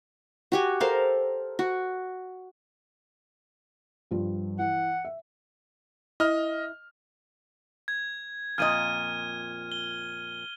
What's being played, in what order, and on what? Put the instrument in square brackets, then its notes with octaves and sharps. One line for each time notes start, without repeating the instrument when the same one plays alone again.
[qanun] F#4 G4 G#5
A4 A#4 C5 F5
F#4
[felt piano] G2 F3 G3
[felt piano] E3 [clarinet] F#5
[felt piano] E5
[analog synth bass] E4 [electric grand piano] D#5 F6
[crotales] G#6
[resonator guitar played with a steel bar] F2 A#2 D#5 [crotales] F6 G#6 D#7
[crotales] G7